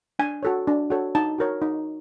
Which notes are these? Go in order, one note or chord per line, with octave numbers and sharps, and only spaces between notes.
D4 G#5
F#4 A4 C#5
D4
F#4 A4 C#5
D#4 A5
F#4 A#4 C#5
D#4